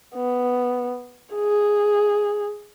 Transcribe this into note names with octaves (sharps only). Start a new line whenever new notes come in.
B3
G#4